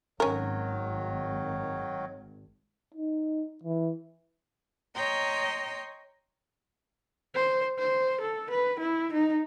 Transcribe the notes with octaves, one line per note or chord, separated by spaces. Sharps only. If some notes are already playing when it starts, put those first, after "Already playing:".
G#1 D#3 F#3 C#4 A#4
D#4
E3
C#5 D#5 G5 A#5 C6
C5
C5
A4
B4
E4
D#4